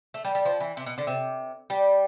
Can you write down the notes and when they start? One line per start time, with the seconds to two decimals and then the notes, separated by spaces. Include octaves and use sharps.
0.14 A3
0.25 G3
0.35 G3
0.45 F3
0.60 E3
0.77 C3
0.86 B2
0.98 D3
1.07 C3
1.70 G3